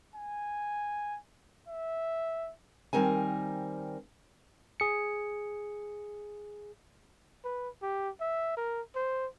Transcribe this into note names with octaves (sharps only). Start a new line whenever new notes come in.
G#5
E5
D#3 G3 C4 A#4 G#5
G#4 C#7
B4
G4
E5
A#4
C5